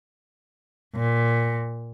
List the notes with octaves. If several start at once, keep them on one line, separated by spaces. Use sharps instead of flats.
A#2